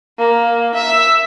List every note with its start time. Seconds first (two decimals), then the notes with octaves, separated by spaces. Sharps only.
0.19 A#3
0.74 E5